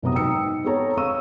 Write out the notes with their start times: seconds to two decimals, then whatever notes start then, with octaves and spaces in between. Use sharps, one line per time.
0.02 F#1 C3 F#3 B3 A#5 D#6
0.14 G#2 G5 E6 C#7
0.64 B3 C4 G#4 A4 C#5 A#5
0.97 C4 C#5 F5 C#6 E6 D#7